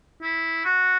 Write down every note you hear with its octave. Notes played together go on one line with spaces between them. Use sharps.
E4
F#4